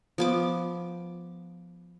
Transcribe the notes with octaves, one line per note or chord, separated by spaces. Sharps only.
F3 B3 D6